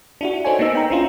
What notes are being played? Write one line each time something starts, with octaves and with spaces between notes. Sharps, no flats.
D4 E4 F#4
D#4 A4 C5 C#5 G#5
A#3 B3 D#4 E6
G5 A#5
C#4 D4 E4 F4